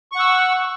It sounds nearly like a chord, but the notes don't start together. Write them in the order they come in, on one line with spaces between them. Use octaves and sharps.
C#6 F#5 E6